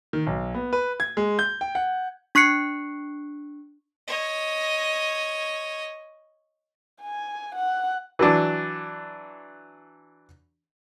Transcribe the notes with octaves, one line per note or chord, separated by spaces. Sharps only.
D#3
B1
B3
B4
G#6
G#3
G6
G5
F#5
D4 C#6 F#6 C7 C#7
C#5 D#5
G#5
F#5
E3 F#3 D4